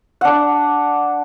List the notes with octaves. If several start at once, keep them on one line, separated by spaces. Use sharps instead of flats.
D4 F#5